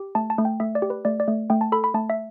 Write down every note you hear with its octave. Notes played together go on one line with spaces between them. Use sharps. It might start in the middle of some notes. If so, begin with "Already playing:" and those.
Already playing: G4
A3 A5
A5
A3
G5
A3 E5
D5
G4
B4
A3 D5
D5
A3
A3 G5
A5
A4 B5
B5
A3 A5
E5